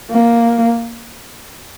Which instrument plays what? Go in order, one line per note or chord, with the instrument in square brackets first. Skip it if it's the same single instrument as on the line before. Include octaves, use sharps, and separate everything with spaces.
[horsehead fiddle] A#3